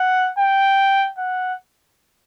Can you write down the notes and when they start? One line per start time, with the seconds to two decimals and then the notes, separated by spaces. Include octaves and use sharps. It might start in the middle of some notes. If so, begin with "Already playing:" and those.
Already playing: F#5
0.39 G5
1.18 F#5